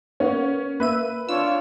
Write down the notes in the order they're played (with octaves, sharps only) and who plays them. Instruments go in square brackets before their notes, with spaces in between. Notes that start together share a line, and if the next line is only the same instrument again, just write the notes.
[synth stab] A#3 B3 [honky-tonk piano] C#4
[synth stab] A#3 E5 D#7 [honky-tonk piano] B4
[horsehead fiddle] D4 C#5 [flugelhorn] F4 [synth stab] E6